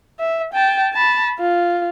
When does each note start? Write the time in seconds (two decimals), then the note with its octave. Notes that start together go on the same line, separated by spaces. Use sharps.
0.19 E5
0.53 G5 A5
0.94 A5 B5
1.40 F4